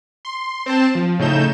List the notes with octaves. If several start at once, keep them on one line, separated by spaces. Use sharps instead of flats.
C6
C4 C5 A5 E7
F3
A2 C#3 A3 D#4 G6 E7